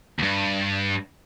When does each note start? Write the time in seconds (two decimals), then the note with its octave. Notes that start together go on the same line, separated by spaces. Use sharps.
0.19 D2 G2